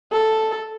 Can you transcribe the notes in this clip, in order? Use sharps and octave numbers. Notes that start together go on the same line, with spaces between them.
A4